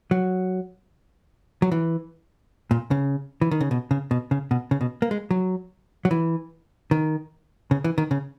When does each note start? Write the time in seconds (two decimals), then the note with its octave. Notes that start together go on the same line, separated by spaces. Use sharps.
0.11 F#3
1.62 F#3
1.72 E3
2.71 A#2
2.91 C#3
3.42 E3
3.51 D#3
3.61 C#3
3.71 B2
3.91 C#3
4.11 B2
4.31 C#3
4.51 B2
4.71 C#3
4.81 B2
5.02 A#3
5.11 G#3
5.31 F#3
6.05 F#3
6.11 E3
6.91 D#3
7.71 C#3
7.84 E3
7.98 D#3
8.11 C#3